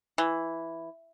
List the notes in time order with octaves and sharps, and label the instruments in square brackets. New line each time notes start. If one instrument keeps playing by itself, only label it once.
[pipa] E3